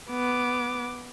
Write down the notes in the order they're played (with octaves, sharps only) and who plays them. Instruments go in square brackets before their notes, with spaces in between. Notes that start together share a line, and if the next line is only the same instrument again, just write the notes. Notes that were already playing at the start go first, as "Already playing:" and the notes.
[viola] B3 D6